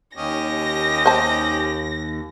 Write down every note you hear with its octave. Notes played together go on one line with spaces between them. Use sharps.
D#2 C#4 G4 D#5 A#6
C5 A5